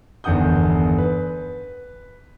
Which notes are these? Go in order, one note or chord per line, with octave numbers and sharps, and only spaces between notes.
G1 E2 D#3 F#5 D#6 G6
B4